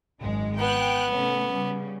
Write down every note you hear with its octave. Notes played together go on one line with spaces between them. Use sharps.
G#1 F#2 G#3
B3 G5 F#6
C3 A3 C#4
C#3 G3